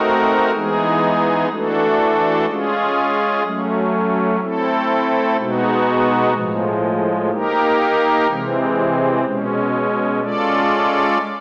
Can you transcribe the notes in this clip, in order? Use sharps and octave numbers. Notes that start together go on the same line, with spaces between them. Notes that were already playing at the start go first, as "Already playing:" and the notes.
Already playing: A3 C4 D#4 F#4 A#4
E3 G#3 B3 D#4 G#4
E3 A3 D4 F#4 A4
G#3 C#4 F4 G#4
F#3 A3 C#4
A3 C4 E4 A4
B2 G#3 B3 D#4 F#4
A2 F3 G#3
A#3 D#4 G4 A#4
C3 E3 G#3 C4
B2 G#3 C#4
G#3 C#4 F4 A4 D5